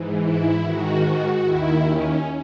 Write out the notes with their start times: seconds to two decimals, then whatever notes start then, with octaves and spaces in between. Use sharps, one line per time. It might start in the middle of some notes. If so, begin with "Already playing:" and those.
Already playing: G#2 E3
0.22 E4
0.63 G#2 D#3 F#4
1.43 D#2 D#3 E4
1.83 C#4